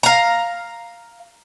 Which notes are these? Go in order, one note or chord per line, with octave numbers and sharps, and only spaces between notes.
F5 A#5